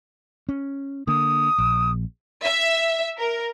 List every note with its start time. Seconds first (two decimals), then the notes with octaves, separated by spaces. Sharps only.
0.49 C#4
1.07 D3 A#3 D#6
1.58 A#1
2.44 E5
3.19 A#4